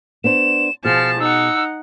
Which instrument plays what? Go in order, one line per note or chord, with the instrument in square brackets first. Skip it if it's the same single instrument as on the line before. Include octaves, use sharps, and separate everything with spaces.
[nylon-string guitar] B3 D4 C5 [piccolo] E7
[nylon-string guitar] B2 G#4 [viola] F3 A5 [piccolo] F6
[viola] D#4 F#5 [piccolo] E6